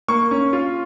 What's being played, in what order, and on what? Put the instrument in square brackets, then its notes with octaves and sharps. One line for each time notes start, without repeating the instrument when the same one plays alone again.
[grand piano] A#3 C#6
C#4
F4